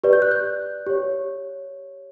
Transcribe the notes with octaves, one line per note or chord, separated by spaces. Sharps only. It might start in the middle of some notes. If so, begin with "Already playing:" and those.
G4 B4 D5
G6
F#6
G6
G4 C#5